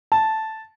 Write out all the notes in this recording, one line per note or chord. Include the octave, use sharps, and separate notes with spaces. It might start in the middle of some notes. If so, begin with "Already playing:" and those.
A5